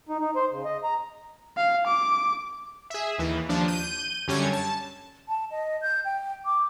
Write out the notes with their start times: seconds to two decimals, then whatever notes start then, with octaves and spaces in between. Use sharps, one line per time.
0.09 D#4
0.20 D#4
0.36 C5
0.51 C#3
0.65 D#5
0.84 A#5
1.57 F5
1.87 D6
2.90 G#4 E5
3.18 D#2 E3
3.49 D#2 F3 D4
3.68 G6 D#7
4.28 F#2 D3 G3 C#4 C#5 G#6
4.53 A5
5.29 A5
5.51 D#5
5.82 G6
6.05 G5
6.46 D6